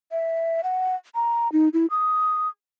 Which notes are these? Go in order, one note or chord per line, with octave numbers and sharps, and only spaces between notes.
E5
F#5
A#5
D#4
E4
D#6